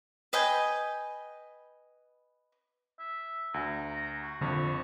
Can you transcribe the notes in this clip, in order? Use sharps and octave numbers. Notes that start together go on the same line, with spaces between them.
B4 D#5 G5 G#5
E5
D2 A#5
F#4
A#1 F2 D3 C#6